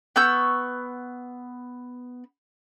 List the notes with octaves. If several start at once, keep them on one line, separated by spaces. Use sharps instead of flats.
B3 C#6 E6 G6